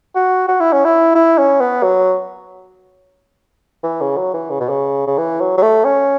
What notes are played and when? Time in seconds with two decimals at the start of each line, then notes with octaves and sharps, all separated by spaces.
0.15 F#4
0.48 F#4
0.60 E4
0.73 C#4
0.85 E4
1.15 E4
1.38 C#4
1.60 B3
1.83 F#3
3.83 E3
4.01 C#3
4.17 F#3
4.34 E3
4.50 C#3
4.60 B2
4.69 C#3
5.07 C#3
5.18 E3
5.41 F#3
5.58 F#3
5.62 A3
5.85 C#4